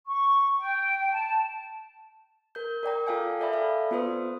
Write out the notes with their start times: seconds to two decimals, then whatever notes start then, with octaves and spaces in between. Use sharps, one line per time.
0.06 C#6
0.59 G5
1.11 A5
2.55 A#4 G6
2.83 A#4 D5 G5 A#5
3.07 F4 A4 F5 G5 G#5
3.40 A4 D5 E5 B5
3.53 A4 E5 F5
3.91 B3 F4 B4 C5 D#6